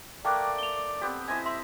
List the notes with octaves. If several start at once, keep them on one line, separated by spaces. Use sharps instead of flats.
A3 A#3 D5 G5 D6 F#6
F7 G7
B3 C4 G4
E4 C5 D#5 G#5
E5 C6